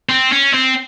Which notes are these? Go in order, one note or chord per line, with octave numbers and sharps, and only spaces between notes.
C4
C#4
C4